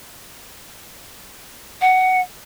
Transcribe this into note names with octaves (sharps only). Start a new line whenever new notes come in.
F#5